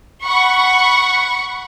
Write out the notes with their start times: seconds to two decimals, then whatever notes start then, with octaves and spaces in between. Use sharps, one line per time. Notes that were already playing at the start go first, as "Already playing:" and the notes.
0.23 F#5 B5 C#6